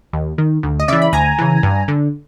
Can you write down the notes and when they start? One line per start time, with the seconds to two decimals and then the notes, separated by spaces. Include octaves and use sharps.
0.13 D#2
0.38 D#3
0.63 D2
0.80 D#5
0.88 C#3 E3 D5 E5
1.02 B5
1.13 D2 G#5 A#5
1.39 C#3 E3
1.63 G2
1.88 D3